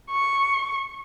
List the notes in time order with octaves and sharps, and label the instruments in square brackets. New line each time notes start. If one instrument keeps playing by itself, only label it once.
[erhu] C#6